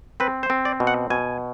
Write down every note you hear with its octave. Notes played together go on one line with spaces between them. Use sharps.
C4 B4
C5
C4
D5
B2
F#5
B2 G#5